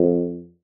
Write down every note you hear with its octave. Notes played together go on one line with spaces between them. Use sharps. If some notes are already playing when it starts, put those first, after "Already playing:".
Already playing: F2